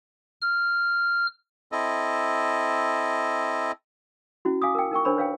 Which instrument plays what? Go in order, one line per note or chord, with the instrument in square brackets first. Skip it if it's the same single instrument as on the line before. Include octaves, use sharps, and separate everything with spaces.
[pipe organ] F6
[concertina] C4 E4 A4 D#5
[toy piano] C#4 E4 F#4
F5 G#5 D6 D#6
A#4 G5
D#4 A#4 G5 C#6
D4 A#4 C5 C#5 B5
B4 C#5 F5 G5